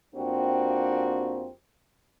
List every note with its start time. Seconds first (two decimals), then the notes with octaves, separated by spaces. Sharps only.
0.15 F2 A#3 C4 D4 F#4 G4